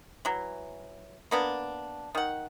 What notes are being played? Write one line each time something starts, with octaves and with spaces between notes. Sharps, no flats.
E3 F#3
A#3 B3 D4
D#3 F#5